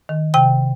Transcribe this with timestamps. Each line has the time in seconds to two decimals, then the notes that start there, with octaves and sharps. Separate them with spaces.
0.09 D#3
0.34 C3 G5